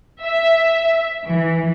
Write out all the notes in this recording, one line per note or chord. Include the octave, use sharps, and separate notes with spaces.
E5
E3